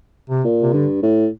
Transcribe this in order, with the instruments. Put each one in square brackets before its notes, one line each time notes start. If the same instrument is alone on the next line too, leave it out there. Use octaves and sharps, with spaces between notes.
[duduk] C3
[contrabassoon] A#2
[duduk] C3
[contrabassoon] G2 [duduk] D3
[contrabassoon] A2